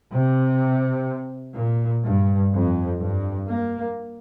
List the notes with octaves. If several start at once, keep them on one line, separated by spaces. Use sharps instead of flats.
C3
A#2
G2
F2
G2
A#3